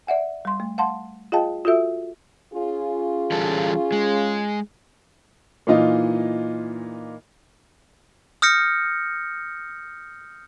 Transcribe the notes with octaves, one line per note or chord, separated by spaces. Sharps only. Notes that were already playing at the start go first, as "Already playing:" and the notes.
D5 E5 F#5 G#5
G3 C6
A3
F5 F#5 A5 C6
F4 G#4 D#5 F5 G5 A5
F4 F#4 A4 E5 E6
C#4 F4 G#4
E3 G3 A4
G#3
A#2 E3 D#4 F4 D#5
D#6 F6 G6 A#6 C#7